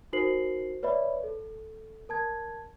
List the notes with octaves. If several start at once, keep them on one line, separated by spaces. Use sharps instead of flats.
D#4 F#4 A#4 C5 C7 F#7
B4 C#5 D5 E5 B5
A4
A#4 A5 G#6